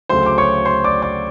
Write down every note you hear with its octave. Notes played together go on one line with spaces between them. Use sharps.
D2 C#3 F#3 A3 C5 C6
D6
C#5 C#6
C5 C6
D5 D6
D5 D6